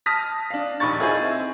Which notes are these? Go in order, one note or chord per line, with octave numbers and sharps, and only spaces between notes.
A5 D#6 F6 A#6 B6
D4 F5
A#1 D#2 B5 C#6 A6
E4 F4 G#4 C5 D#5 G#5
C4 E4